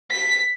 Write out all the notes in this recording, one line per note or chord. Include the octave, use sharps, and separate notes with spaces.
B6